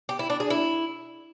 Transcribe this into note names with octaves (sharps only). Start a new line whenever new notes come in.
G4
E4
D4
G#4
E4